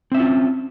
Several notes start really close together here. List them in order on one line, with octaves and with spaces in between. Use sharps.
C4 E5 C#4 F4